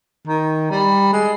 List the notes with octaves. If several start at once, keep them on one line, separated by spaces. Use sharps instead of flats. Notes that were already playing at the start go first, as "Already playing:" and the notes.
D#3
G3
G#3